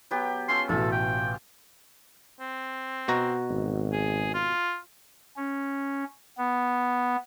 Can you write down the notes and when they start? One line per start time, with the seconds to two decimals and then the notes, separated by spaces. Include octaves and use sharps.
0.11 F#3 B3 G4
0.48 C#4 F4 A4 C6
0.69 A1 B2 F4 A4
0.92 G5
2.40 C4
3.08 B2 F#4 A#5
3.50 G#1
3.92 G#4
4.34 F4
5.37 C#4
6.37 B3